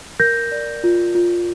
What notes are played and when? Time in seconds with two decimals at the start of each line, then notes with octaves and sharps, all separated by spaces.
0.20 A#4 G6 A#6
0.52 D5
0.84 F4
1.15 F4